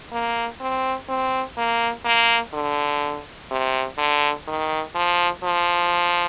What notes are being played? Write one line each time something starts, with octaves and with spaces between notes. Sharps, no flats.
A#3
C4
C4
A#3
A#3
D3
C3
D3
D#3
F3
F3